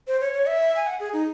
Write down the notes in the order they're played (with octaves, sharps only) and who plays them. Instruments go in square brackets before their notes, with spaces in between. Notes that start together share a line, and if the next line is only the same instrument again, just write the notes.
[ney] C5
C#5
C#5
E5
G#5
F#5
G#4
D#4